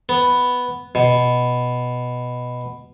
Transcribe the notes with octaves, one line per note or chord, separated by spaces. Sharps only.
B3
B2